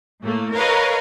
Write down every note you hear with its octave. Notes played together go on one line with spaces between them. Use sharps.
A2 A3 A#3
A#4 B4 C#5 D#5 F5